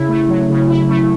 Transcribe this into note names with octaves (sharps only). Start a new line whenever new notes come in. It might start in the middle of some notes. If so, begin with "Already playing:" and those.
Already playing: C#3 E4
A3
F#3
C#3
E4
A3